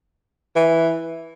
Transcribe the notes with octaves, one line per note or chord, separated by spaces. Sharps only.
E3